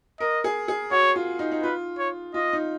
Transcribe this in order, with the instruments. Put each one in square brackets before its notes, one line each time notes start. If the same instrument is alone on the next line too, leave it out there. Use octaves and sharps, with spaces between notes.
[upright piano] A#4 [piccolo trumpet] D#5
[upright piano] G#4
G#4
[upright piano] F#4 [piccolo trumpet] C#5
[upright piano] F4
D#4
D#4
[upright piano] F4 [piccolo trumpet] B4
[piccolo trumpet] C#5
[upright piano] F4 [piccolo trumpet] D#5
[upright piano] D#4